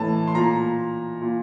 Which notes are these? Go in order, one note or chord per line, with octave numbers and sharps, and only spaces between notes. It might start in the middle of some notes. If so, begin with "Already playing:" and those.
Already playing: A2 E3 A5
C6
A#2 A#5
A#2